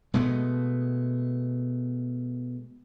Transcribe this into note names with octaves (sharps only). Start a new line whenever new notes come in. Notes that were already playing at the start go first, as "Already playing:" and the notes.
B2 G#3 A3 B3